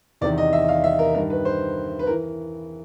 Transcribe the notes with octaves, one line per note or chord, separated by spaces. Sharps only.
E2 C3 D#3 D5
D#5
E5
F5
E5
A#4
G2 D#3 A#4
B4
C5
B4
E3 A#4